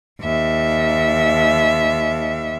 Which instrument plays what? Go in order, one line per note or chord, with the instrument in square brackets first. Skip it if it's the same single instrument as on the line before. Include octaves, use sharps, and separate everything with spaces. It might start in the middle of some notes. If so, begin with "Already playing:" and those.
[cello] D#2 E5